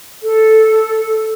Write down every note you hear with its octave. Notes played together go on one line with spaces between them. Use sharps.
A4